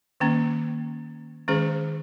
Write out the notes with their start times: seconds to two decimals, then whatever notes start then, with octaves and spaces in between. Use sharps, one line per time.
0.20 D#3 A#3 C#4
1.48 D#3 G#3 C#4 G#4 C5